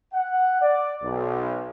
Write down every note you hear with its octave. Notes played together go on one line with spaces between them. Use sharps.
F#5
D5
B1